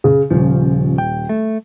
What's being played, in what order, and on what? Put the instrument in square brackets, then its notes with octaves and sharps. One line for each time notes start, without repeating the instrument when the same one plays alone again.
[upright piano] C#3
[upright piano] D#1 [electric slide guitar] C#3 F3
[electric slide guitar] G5
A3